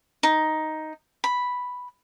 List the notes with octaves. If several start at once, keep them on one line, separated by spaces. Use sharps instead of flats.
D#4
B5